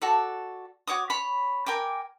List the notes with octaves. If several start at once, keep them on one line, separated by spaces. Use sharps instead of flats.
F#4 A4 D5
F#4 C#5 D6 D#6
C#5 B5
A#4 G5 G#5 D6